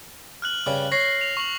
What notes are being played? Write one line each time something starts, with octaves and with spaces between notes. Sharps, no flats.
F6 F#6 F#7
G2 C#3 G3
C#5 A#6 C7
F7
C#6 F#7